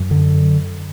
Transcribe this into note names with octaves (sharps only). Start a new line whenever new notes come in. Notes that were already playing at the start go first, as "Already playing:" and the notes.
Already playing: F#2
D3